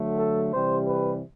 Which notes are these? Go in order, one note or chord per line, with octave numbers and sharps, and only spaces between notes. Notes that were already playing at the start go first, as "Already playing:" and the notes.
Already playing: D3 F#3 A3
A4
C3 E3 G3 C5
B4